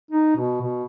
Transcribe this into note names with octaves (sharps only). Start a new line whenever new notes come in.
D#4
B2
B2